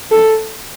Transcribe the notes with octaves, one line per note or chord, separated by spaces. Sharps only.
A4